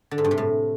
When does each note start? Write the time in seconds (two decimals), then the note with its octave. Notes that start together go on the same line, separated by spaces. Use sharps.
0.11 D3
0.18 G#2
0.24 G2
0.31 C3
0.38 A2